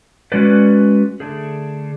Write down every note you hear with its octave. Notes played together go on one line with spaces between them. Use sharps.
G#3 C#4 F#4 B4 D5
D3 A3 D4 G#4